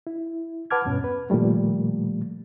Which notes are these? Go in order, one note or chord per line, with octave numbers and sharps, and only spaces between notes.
E4
B4 F#5 A5 D6 F6 G#6
E2 G2 B2 C#4
B4
A#2 D#3 F3 G3 A3